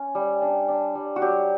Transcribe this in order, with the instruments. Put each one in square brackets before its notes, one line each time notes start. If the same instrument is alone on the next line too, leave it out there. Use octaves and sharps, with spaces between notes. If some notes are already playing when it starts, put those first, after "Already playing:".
Already playing: [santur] C#4
G3
D4
D4
G3
F#4
F#3 G4